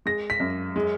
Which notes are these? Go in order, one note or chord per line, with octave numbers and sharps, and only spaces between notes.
G#3 A#6
B6
F#2
G#3